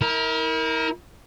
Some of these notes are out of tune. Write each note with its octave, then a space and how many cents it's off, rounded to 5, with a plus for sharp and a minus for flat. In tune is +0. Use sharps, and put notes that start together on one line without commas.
E4 -40 A#4 +0